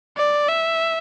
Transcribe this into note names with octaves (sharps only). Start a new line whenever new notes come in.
D5
E5